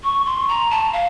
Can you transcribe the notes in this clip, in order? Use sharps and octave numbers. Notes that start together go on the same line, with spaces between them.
C#6
C6
A#5
A5
F5